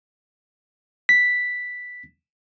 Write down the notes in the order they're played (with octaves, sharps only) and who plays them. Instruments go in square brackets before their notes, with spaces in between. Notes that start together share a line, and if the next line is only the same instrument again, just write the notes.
[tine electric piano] B6